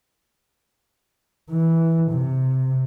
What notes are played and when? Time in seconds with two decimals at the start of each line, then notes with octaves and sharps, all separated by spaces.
1.50 E3
2.11 C3